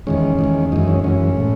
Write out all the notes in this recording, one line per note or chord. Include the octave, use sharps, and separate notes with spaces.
E2 D#3 G#3 C#4
E2 D#3 G#3
F#2 E3 G#3 D#4
C#4
F#2 E3 G#3 C#4
A2 G#3